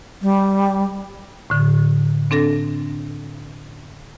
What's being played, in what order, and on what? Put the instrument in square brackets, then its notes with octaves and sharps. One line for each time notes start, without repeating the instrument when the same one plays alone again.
[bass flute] G3
[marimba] A2 D3
C4 D4 A4 A#6